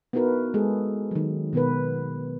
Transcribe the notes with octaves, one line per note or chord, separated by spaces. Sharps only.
B3 D#4 E4 F#4 A#4 B4
G#3 G#4 A4
D#3 F#3
B2 D#3 B3 A#4 B4